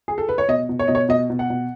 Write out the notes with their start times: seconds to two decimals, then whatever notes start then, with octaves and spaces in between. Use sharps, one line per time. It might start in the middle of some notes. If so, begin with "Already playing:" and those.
0.08 G#4
0.18 A4
0.29 B4
0.38 C#5
0.48 B2 D#5
0.69 B2
0.79 C#5
0.87 B2 D#5
0.95 C#5
1.09 B2 D#5
1.30 B2
1.39 F#5
1.50 B2